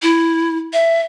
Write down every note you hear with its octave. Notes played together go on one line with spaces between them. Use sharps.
E4
E5